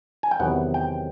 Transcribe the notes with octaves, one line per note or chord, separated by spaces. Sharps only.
G#5
G5
E2 C3 D#3 F#3 B3 F#5
G5